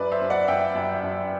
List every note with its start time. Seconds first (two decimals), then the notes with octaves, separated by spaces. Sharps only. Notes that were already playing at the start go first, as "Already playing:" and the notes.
Already playing: F#2 B4 D5
0.12 C5 E5
0.21 F#2
0.30 D5 F#5
0.48 F#2 E5 G5
0.75 F#2
1.03 F#2